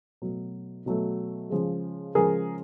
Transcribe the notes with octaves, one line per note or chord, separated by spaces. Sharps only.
B2 F#3 A3
B2 F#3 A3
C#3 F3 G#3
C#3 F3 G#3 G#4 A#4